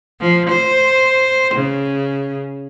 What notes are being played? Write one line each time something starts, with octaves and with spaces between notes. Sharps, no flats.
F3
C5
C#3